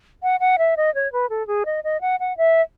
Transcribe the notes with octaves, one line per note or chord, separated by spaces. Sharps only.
F#5
F#5
E5
D#5
C#5
B4
A4
G#4
D#5
D#5
F#5
F#5
E5